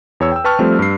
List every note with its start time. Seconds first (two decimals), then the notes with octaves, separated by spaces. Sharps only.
0.20 E2 C#5 E6
0.32 G5 E6
0.44 B4 G5 A5 C#6 F6
0.59 F3 G3 A3 C4
0.79 G2 C7